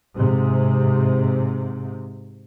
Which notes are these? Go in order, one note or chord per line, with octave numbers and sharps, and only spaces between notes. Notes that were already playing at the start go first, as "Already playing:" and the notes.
G#2 C3